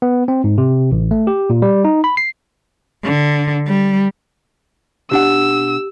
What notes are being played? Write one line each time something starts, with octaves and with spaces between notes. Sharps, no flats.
B3
C4
G#2
C3
A1
A3
G4
A#2
G3
D#4
B5
C7
D3
G3
B2 D4 G4 F#5 E6